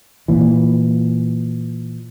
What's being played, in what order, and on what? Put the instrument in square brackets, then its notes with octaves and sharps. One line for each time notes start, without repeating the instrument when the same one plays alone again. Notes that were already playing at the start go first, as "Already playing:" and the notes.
[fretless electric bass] A#2 E3